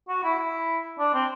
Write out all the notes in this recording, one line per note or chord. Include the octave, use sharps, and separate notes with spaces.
F#4
E4
E4
D4
C4